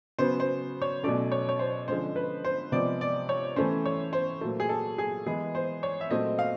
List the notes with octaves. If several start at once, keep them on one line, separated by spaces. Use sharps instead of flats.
C#3 F#3 B3 C5
C5
C#5
B2 F#3 A3 C#4 D5
C#5
C#5
C5
D3 F3 G#3 C#4 C5
B4
C5
C3 F3 G#3 B3 D5
D5
C#5
E3 A3 C#4 C5
C#5
C5
A#2 F#3 A3
G#4
A4
G#4
E3 G#3 B3 G#4
C5
C#5
E5
A#2 F#3 A3 C4 D#5
F5